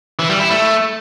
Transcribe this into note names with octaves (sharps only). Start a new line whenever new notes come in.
E3
G3
E4
A3